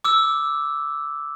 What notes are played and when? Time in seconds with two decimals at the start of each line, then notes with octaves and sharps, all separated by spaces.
0.04 D6 E6